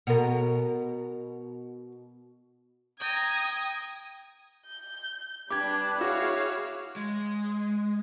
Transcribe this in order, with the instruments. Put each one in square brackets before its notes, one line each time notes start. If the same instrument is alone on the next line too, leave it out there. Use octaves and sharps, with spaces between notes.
[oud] B2 A#4
[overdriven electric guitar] G5 [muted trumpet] A#5 [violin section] D#6 G#6
[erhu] G6
[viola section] G3 D4 [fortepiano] G4 G5 [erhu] B4 [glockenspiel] D6 G#6
[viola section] E4 G#4 C#5 [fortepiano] F#4 [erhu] F5
[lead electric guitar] G#3